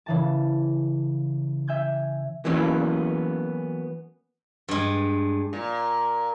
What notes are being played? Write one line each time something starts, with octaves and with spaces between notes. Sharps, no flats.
C#3 E3 A5
E5 G#5 G6 G#6
E3 F#3 A#3 B3 C#4
G2 G#3
A#2